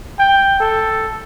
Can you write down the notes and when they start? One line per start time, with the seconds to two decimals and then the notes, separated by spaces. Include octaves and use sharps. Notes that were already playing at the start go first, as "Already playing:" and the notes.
0.19 G5
0.60 A4